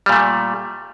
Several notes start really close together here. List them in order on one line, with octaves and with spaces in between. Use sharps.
G3 A#2 A3